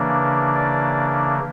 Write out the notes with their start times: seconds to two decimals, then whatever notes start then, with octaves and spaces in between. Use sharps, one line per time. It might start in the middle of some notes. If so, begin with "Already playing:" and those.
Already playing: C#3 E3 A#3 D4
0.55 D5